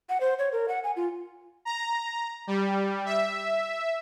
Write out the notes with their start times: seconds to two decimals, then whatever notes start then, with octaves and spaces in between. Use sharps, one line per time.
0.09 F#5
0.20 C5
0.39 C#5
0.52 A#4
0.68 F#5
0.84 G#5
0.96 F4
1.65 A#5
2.47 G3
3.06 E5